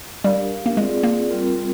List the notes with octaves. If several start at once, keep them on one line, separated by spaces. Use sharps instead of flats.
G3 D4 G4 A#4 F5
A#3
G#3 C4 F4 G#4 D5
A#3
G3 C4 F4 A#4